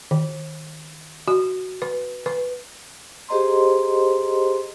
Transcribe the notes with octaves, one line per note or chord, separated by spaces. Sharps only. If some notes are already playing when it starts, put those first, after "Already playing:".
D#3
F#4
B4
B4
G4 G#4 C5 D#5 A#5 C6